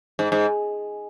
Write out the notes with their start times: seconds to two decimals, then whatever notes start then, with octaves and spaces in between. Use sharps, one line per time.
0.19 G#2
0.32 G#2